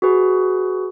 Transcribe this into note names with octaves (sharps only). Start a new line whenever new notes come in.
F#4 G#4 B4